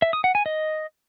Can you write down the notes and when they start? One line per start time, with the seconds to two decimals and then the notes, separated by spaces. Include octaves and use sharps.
0.02 E5
0.13 D#6
0.24 F#5
0.35 G#5
0.46 D#5